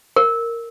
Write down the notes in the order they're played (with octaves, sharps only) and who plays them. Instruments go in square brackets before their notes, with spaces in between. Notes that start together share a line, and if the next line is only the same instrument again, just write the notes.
[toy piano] A#4